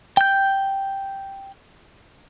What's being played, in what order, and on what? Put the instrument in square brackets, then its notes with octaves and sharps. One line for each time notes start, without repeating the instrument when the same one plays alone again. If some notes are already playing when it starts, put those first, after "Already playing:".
[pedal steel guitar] G5 G6